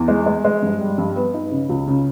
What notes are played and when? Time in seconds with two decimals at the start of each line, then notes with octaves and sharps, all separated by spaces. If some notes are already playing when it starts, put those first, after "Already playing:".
Already playing: E2
0.08 G#3
0.26 G#3
0.45 G#3
0.62 G2
0.80 G3
0.98 G2
1.16 B3
1.34 D#4
1.51 C#3
1.69 C#2
1.88 C#3